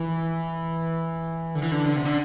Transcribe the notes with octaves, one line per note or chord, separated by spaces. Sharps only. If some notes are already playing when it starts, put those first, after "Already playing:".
Already playing: E3
D3
E3
D3
D3
C3
D3